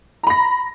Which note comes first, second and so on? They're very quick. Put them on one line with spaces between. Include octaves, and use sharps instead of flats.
A#5 B5 A#6